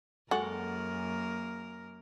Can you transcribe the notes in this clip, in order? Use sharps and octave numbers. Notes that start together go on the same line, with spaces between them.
F#2 G#3 A#3 F#4 A4 A#4